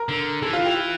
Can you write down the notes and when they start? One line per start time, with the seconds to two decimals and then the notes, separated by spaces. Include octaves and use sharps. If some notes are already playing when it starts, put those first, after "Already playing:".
Already playing: A#4
0.09 D3
0.42 E3 A4
0.53 F4
0.64 G4
0.74 F4